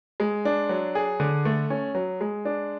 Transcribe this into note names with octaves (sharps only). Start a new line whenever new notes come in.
G#3
D4
F#3
G#4
D3
A3
C#4
F#3
G#3
D4